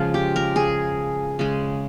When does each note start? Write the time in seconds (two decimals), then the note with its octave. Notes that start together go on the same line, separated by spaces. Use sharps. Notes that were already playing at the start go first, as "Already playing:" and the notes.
Already playing: C#3 F3 G#3 F4
0.14 G4
0.36 A#4
0.56 G#4
1.39 C#3 G#3